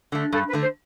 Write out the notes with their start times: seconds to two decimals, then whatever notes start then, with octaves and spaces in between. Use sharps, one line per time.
0.12 D3 A3
0.33 G2 A4
0.47 B4
0.53 D3 A3
0.61 C5